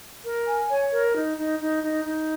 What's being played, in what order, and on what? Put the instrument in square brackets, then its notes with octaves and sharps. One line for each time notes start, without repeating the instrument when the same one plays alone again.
[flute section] A#4
G#5
C#5
A#4
D#4
D#4
D#4
D#4
D#4